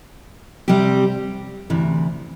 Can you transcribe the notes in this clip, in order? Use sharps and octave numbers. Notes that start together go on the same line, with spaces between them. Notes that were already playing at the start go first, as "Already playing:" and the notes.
C3 G3 C4 G4
D2 C3 E3